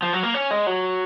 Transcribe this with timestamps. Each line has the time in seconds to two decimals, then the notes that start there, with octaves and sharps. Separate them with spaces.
0.02 F3
0.13 F#3
0.23 A#3
0.34 C#4
0.51 G#3
0.67 F#3